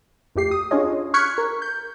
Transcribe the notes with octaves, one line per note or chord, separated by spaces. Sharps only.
F2 A3 G4 C7
D#6
C#4 D4 F4 G#4 C#5 D#5
C#6 F6 F#6 G#6 B6 C#7
A#4
G6